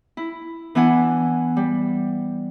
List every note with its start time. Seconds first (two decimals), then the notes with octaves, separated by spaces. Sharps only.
0.17 E4
0.75 E3 B3 D4 E4 F#5 G#5
1.57 G3